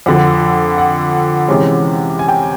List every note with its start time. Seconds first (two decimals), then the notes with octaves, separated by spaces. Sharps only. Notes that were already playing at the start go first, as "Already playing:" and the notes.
0.06 F2 D3 F3 F#5
0.78 F#5
1.48 C3 E3 G#3 C#4
2.19 G#5
2.28 G5